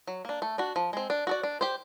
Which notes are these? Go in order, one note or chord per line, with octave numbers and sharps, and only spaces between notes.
F#3
A#3 D4
A3
D4 F#4
F3
G#3 C4
D4
F#4 A4 D5
D4
G4 C5